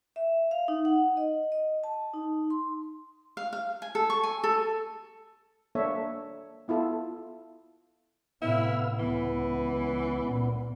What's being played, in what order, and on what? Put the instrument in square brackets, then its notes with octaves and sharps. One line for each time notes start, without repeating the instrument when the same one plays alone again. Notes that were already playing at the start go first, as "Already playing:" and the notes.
[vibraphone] E5
F5
D#4
F#5
D#5
D#5
A5
D#4
C6
[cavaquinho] F5
F5
G#5
A4
C#6
G#5
A4
[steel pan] A#3 D4 A4 C#5 E5
B3 E4 F4 A4
[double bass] A2 C3 [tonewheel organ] B3 F5 E6 [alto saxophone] E4
[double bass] C#2 [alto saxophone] E3 [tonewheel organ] B3
[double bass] A#2